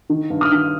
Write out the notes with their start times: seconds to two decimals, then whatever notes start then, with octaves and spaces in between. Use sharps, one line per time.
0.10 D#3
0.30 G2
0.41 D#6 F6
0.52 D#3